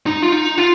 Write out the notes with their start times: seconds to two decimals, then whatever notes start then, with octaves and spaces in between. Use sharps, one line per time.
0.06 D#4
0.22 F4
0.32 D#4
0.58 F4